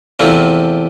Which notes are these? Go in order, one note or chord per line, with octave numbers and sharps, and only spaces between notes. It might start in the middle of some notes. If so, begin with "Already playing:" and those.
E2 C3 F3 A3 C4